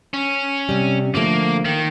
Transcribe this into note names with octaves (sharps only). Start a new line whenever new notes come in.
C#4
C3 G3
D3 F3 A3 A#3
D#3 A#3